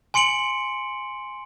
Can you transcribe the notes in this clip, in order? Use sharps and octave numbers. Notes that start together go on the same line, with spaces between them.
G#5 C6 C#7 D7 F#7